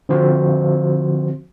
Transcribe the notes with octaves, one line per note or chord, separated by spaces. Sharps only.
D3 F3 C4 F#4 C5